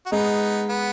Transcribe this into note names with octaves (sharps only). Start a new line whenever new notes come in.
F#4
G#3 B3 D#4
B3